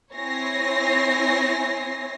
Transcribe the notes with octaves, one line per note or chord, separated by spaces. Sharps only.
C4 E4 C#5 G#5 A#6 C7